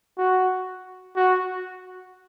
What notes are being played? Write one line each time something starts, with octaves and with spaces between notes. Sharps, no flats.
F#4
F#4